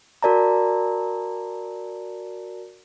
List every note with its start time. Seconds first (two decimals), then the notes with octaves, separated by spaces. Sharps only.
0.23 F#4 A#4 D5 A5 A#5